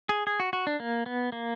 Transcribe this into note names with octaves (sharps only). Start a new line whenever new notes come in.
G#4
G#4
F#4
F#4
D4
A#3
B3
A#3